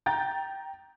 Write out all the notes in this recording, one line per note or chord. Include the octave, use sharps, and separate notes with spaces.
G5 A#5 G6 A6